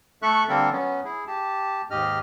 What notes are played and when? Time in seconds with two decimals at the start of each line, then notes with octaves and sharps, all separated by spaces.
0.22 A3 A4 E5 C#6 F#6
0.49 D3 G3 A#3 C4 A4 A#4
0.72 F#3 B3 C#4
1.04 E4 G#4
1.27 G4 A5
1.90 D#2 G#2 G4 D#5 F6